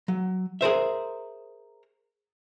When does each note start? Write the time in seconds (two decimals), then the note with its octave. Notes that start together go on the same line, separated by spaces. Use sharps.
0.08 F#3
0.61 G#4 A#4 C5 E5